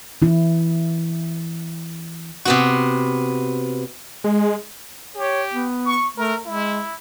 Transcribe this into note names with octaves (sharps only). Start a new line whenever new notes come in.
E3 E4
C3 B3 F#4
G#3
G4 C#5
B3
C#6
A3 A#4
G#3 E4